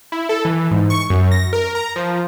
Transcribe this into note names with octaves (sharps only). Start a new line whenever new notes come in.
E4
A4
E3
G#2
C#6
F#2
A#6
A#4
A#5
F3